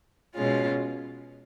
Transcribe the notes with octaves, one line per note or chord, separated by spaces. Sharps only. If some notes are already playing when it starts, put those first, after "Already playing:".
B2 G#3 C#4 F4